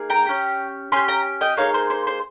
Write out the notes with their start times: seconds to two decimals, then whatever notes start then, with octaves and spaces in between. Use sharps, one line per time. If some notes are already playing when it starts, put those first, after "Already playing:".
Already playing: A#3 D#4 G#4
0.10 G5 A#5
0.27 C#4 G4
0.92 C#4 G4 G#5 C6
1.08 G5 A#5
1.41 D#5 G5
1.57 A#3 D#4 G#4 C#5 F5
1.74 C5
1.90 C5
2.07 C5